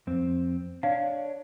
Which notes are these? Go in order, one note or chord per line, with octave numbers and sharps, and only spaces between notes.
F2 C4
D4 C#5 F5